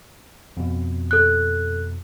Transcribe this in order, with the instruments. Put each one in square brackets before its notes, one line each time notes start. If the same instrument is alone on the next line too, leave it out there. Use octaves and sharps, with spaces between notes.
[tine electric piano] F2 B2
[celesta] A4 F#6